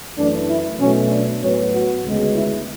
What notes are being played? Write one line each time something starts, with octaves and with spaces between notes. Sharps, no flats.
F#2 E3 A3 D4
E4
B2 F#3 A3 C#4
D4
A2 F#3 B3 C#4
F#4
D2 C#3 G#3 B3
E4